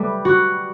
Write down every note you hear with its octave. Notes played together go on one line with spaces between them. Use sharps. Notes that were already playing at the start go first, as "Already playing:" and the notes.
Already playing: G3 A3 B4
F#4